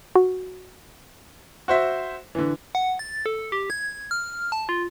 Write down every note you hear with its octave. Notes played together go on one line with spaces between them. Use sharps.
F#4
F#4 C5 E5
D3 E3
F#5
A6
A4
G4
G#6
F6
A5
F4